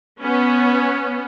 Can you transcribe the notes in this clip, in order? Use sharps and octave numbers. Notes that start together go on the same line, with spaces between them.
B3 C#4